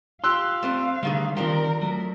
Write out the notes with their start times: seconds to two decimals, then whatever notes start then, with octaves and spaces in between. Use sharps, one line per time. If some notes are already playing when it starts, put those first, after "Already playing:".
0.24 F4 G4 F5 C6 E6 F#6
0.63 A3 C4 C5
1.03 B2 D3 D#3 G3 A3 G#4
1.37 D#3 F3 C4 D4 F4 G4 A#4
1.81 F#3 A3 A#4